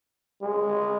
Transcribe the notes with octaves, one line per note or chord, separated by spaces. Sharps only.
G#3